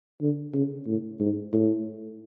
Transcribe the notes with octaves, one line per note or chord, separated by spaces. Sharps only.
D3
C#3
A2
G#2
A2